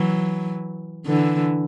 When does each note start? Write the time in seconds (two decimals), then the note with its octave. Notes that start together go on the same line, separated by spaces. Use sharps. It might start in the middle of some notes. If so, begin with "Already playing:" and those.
Already playing: E3 F#3
1.07 D3 E3